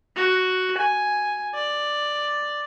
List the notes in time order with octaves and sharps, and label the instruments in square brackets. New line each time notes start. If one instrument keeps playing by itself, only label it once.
[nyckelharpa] F#4
G#5
D5